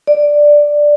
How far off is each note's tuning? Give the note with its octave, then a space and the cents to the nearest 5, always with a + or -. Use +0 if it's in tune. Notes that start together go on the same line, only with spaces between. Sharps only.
D5 +5